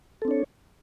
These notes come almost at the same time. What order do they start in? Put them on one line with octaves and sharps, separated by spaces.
A4 C4 D4 C#5